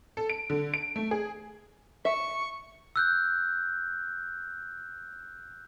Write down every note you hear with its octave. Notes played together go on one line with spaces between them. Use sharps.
A4
D7
D3
D7
A3
G#4
E5 C#6
E6 F#6 G6